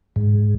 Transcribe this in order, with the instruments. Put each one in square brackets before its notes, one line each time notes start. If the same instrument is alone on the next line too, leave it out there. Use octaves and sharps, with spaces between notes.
[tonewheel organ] G#2